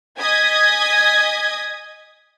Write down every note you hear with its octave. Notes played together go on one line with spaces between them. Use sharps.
D#5 G#5 D#6 G#6 B6